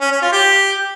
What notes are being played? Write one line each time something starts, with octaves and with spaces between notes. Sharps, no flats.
C#4
C#4
F4
G4